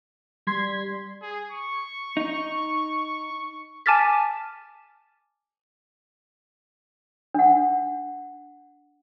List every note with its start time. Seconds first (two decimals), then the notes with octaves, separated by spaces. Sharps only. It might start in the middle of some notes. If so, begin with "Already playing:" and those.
0.47 G3 C6 G#6 B6
1.22 G#4
1.52 C#6
2.17 D#4
3.86 G#5 A5 D6 F6 A6 B6
7.34 D4 F#5